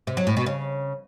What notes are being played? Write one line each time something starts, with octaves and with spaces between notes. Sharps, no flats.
C3
F#3
A2
B2
C#3